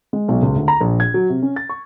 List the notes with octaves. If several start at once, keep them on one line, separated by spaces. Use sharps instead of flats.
G#3
B1
C#2
D2
A#5
A#1
G#6
F#3
C3
C#4
A6
C#6